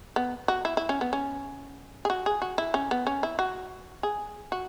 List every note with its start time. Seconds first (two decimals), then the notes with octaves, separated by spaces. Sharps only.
0.16 B3
0.48 F#4
0.65 E4
0.77 E4
0.89 C#4
1.01 B3
1.13 C#4
2.05 G#4
2.10 F#4
2.26 G#4
2.42 F#4
2.58 E4
2.74 C#4
2.91 B3
3.07 C#4
3.23 E4
3.39 F#4
4.03 G#4
4.52 F#4